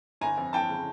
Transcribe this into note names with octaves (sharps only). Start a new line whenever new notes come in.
G1 G#5 A#5
F2
F2 G5 A5
C#3